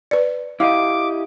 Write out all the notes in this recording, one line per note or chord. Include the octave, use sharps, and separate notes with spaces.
B4 D5
E4 G4 D#5 F5 D6